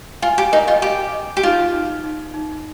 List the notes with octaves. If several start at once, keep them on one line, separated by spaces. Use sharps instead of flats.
F4 G#5
G4
D#4 A#4
F4
G4 D#5
D#5
G4
D#4 F4
D#4
D#4
D#4